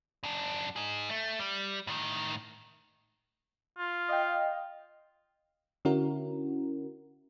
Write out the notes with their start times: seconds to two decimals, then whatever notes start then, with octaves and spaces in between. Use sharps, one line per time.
0.23 F#2 D4
0.76 D#4 G#4
1.09 A3
1.39 G3
1.87 A2 D#3
3.78 F4
4.09 D#5 F5 G5
5.85 D3 C#4 E4 F#4 A#4